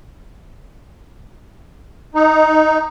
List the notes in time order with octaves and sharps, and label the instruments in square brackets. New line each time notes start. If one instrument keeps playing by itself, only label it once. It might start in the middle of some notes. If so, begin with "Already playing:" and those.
[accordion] D#4